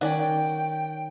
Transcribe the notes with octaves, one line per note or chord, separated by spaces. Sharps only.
D#3 C#4 D5 F#5 G5